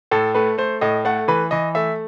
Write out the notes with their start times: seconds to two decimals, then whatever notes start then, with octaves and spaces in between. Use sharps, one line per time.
0.11 A2 A4
0.35 A3 B4
0.58 A3 C5
0.81 A2 D#5
1.05 A3 F#5
1.28 E3 B4
1.51 E3 D#5
1.75 A3 E5